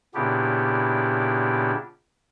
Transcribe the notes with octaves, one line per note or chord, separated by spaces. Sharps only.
A#2 C#3 B3 D4 E4 G4